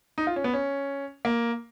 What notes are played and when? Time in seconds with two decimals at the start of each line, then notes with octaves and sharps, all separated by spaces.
0.18 D#4
0.27 F4
0.36 C#4
0.44 B3
0.53 C#4
1.25 A#3